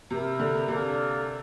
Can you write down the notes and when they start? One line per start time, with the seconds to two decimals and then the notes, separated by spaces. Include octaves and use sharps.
0.11 C3 E4 G4 A#4
0.39 D3
0.68 C3 A#3 D4 A4 D5 F5